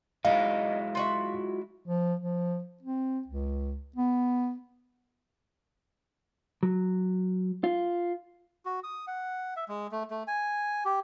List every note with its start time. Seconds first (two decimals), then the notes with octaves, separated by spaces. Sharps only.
0.25 F#3 G#3 D#4 E4 F5
0.95 F4 F#4 E5
1.86 F3
2.20 F3
2.83 C4
3.28 C#2
3.96 B3
6.63 F#3
7.64 F4
8.65 F#4
8.84 D#6
9.07 F#5
9.56 E5
9.68 G#3
9.92 A3
10.10 A3
10.28 G#5
10.85 G4